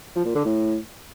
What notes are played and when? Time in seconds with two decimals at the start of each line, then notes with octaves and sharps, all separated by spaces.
0.15 F3
0.25 A#2
0.35 D3
0.45 A2